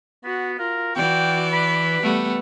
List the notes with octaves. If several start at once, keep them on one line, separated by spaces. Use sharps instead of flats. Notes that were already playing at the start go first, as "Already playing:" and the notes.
B3 F#4
F4 A#4
E3 F#4 D5 G5
B4 B5
G3 A3 B3